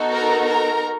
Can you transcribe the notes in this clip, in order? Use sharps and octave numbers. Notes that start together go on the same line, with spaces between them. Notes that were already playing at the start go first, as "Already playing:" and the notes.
Already playing: B3 D#4 F#4 A4
A#4 A#5
A#4 A#5